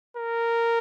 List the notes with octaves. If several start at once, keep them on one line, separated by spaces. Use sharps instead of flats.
A#4